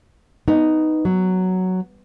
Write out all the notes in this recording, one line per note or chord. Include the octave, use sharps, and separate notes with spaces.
B3 D#4
F#3